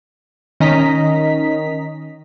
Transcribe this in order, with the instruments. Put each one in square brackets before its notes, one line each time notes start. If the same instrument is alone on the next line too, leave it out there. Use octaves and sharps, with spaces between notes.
[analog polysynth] D#3 C#4 D#5 A#5 B6